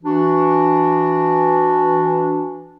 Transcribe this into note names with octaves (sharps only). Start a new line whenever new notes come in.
E3 D4 F#4